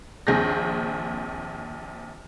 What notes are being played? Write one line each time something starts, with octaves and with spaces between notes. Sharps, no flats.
A#1 D#2 C4 G#4 G6 A#6